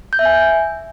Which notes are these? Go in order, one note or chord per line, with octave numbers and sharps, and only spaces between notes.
G6
E5
G#5